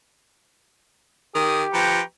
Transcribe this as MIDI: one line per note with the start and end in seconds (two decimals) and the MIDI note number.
1.35 1.64 51
1.35 2.03 67
1.35 1.60 87
1.74 2.00 53
1.74 2.01 71
1.74 2.01 79
1.74 2.01 82
1.74 2.00 85